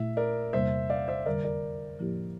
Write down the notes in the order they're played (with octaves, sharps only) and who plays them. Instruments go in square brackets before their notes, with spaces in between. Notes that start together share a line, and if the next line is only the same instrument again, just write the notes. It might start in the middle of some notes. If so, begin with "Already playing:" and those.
Already playing: [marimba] A#2 A3 E4 [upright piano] E5
[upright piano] A#4 D5
[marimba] E2 C3 G3 A#3 [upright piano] C5 E5
[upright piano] D5 F5
C5 E5
[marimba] F2 D3 G3 [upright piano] A#4 D5
[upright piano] A#4 D5
[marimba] A2 F3 A#3 E4 G4